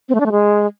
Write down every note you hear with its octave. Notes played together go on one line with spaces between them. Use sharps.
C4
A3
D4
A3
G#3